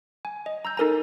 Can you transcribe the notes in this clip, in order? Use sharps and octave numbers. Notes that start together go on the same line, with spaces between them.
G#5
D#5
A#5 E6 G6
D#4 A4 A#4 G#5 A#5